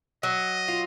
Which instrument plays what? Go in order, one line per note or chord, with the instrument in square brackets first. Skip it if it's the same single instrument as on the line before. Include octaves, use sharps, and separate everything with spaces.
[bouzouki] F#3 [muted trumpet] D#5
[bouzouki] F4